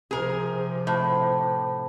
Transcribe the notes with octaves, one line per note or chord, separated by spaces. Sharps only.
C3 F3 G#4 A#4
A2